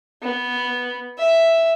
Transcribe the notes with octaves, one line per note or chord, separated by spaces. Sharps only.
B3
E5